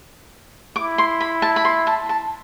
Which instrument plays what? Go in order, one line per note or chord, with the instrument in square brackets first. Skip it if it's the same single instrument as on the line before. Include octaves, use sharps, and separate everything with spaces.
[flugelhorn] E4 [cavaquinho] D6
[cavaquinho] C6
B5
A5
B5
C6
A5
A5